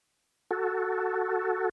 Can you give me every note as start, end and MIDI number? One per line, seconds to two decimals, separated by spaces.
0.51 1.69 66
0.51 1.69 69